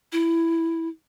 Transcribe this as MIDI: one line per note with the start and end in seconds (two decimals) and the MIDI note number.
0.12 0.88 64